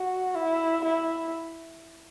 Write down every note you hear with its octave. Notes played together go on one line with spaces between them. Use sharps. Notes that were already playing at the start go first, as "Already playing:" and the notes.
Already playing: F#4
E4
E4